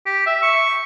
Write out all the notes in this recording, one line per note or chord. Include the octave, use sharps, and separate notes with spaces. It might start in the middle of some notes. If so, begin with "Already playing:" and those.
G4
E5
C#6